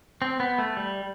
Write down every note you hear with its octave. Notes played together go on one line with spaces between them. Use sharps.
C4
B3
A3
G3